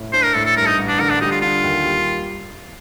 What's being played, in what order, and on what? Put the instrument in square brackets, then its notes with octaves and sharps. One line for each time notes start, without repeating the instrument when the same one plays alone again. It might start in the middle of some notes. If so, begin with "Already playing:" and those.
Already playing: [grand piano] A2
[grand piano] D4 [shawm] C5
[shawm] A#4
[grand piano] A2 [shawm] A4
[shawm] A4
[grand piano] G2 [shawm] A#4
[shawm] D#4
[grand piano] A1
[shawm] D4
[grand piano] D3 [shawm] A#4
[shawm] D4
[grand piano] G3 [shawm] D#4
[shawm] F4
[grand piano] D3 [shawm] F4
[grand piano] D#2
G3